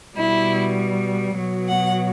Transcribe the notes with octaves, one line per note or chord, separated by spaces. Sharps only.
B2 G3 E4
B2 F#3
F#5